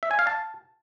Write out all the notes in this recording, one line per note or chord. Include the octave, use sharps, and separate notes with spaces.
E5
G#5
F5
A5